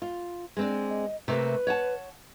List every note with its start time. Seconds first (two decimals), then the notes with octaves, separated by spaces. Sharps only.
0.02 F4
0.57 G#3 C4 D4
0.89 D#5
1.28 C3 A3 A#3 B4
1.67 C#5 F#5 A5